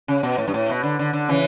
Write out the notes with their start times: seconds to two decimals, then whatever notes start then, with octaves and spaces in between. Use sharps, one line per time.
0.08 C#3
0.23 B2
0.38 A2
0.48 G2
0.54 A2
0.69 B2
0.83 D3
0.99 D3
1.13 D3
1.29 C#3 E3